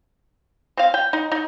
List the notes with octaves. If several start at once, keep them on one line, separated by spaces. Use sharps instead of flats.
C4 F5
G5
D#4
D#4